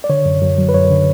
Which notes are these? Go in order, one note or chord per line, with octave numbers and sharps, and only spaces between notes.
D5
D3 C#5
F#2
F#2
F#3
B4
F#2 C#5
D3